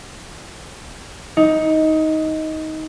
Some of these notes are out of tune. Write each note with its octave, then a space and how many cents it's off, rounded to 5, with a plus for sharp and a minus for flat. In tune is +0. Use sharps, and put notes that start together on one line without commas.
D#4 +15